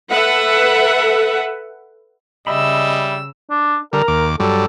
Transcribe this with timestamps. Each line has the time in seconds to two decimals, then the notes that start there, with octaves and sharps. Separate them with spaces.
0.10 A4 B4 E5 F#5
2.47 C#3 G3 D#5 E5 B5 E6
3.50 D4
3.93 D3 G3 A#4
4.08 D#2 D6
4.40 G2 F#3 G3 A4